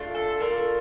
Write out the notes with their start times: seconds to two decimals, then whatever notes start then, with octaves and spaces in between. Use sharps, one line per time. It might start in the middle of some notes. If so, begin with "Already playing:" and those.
Already playing: A3 D4 F4
0.15 A4
0.40 A3 D4 F4 A#4